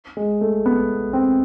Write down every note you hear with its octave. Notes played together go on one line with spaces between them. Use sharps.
G#3
A3
B3
C4